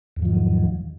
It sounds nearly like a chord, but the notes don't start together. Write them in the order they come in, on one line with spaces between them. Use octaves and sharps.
E2 G#2 F3 D#3 F#3